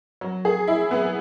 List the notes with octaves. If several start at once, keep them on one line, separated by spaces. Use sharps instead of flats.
F#3
G#4
E4
B3